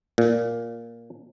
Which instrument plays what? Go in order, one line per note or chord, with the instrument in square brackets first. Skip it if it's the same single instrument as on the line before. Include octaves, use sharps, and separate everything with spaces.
[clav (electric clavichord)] A#2